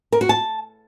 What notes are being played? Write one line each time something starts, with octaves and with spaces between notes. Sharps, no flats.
A#4
F#4
A5